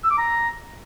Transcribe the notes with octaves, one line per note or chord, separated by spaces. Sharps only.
E6
D6
A#5